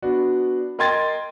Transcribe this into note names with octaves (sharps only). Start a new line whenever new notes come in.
B3 D4 F#4
A#4 D#5 G5 C6 G#6 A6